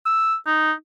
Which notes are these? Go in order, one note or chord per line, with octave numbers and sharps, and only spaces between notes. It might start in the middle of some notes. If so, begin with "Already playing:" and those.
E6
D#4